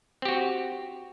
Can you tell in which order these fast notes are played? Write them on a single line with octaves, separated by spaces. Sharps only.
C4 G4 F#4